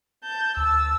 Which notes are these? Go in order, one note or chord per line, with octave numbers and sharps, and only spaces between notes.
A5 G6
D2 A5 E6